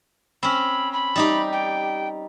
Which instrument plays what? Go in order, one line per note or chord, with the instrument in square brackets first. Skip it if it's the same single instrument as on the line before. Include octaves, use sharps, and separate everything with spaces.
[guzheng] C4 C#4 [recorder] B5
[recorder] B5
[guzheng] G3 D#4 G4
[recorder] G5